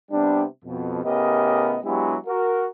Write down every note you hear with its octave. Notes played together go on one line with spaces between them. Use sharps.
C3 G3 B3 D4
F2 B2
A2 C#3 B3 G4 A#4 D#5
F#3 G#3 B3 D4 E4 G4
F#4 A#4